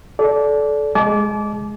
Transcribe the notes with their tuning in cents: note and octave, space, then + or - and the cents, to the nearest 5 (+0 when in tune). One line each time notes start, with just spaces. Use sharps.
A4 -25 D5 -20
G#3 +0 A5 -45 D6 -20